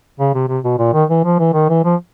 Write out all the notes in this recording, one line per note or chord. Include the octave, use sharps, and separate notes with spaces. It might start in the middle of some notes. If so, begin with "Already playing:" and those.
C#3
C3
C3
B2
A#2
D#3
E3
F3
E3
D#3
E3
F3